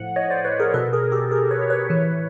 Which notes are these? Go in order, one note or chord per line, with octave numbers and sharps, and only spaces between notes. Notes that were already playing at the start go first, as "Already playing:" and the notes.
Already playing: A2 F3 F#5
C#5 D#5
C5 D5
B4 C#5
G#4 A#4
B2 A4 B4
G#4 A#4
G4 A4
G#4 A#4
B4 C#5
B4 C#5
A2 E3